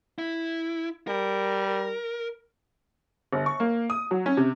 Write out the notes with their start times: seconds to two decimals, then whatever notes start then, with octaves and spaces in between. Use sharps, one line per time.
0.19 E4
1.08 G3 A#4
3.33 G1
3.46 C#6
3.60 A#3
3.90 D#6
4.11 F#3
4.26 C#4
4.37 C3